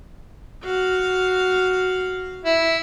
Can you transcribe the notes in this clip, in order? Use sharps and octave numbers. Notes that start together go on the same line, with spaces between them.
F#4 F5
E4